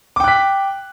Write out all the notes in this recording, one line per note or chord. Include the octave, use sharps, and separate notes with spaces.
G5 D6 F#6 B6